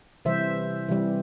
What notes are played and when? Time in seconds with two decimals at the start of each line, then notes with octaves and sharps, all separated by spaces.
0.25 C3 E3 G3 C5 E5
0.89 C3 E3 G3